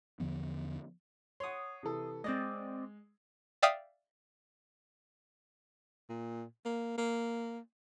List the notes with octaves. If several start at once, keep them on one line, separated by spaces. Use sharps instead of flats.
E2 D3 F3 B3
C#5 F#5 C6 D#6
C3 E3 A4
G#3 C4 D5 D#5
D5 E5 F5 G5 D#6
A#2
A#3
A#3